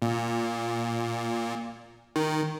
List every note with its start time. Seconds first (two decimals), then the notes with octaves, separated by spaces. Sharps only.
0.02 A#2
2.16 D#3